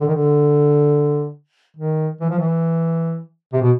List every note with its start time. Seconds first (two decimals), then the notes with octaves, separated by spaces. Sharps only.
0.01 D3
0.08 D#3
0.15 D3
1.77 D#3
2.21 E3
2.30 F3
2.39 E3
3.53 C3
3.62 B2